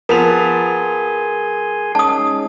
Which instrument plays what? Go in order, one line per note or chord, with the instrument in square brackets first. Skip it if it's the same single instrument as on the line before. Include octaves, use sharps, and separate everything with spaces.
[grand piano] F3 B3 F7 [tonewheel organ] G#4 G#5 C6 [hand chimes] A#4
[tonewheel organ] G#3 C#4 D#4 [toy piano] A5 D#6